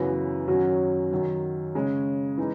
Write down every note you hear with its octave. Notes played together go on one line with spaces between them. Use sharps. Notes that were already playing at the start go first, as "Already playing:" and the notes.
Already playing: F#2 C#3 E3 B3 F#4
F#2 D#3 F#3 C#4 F#4
F#2 D#3 F#3
C#3 G#3 C#4 G#4
E3 G#3 D#4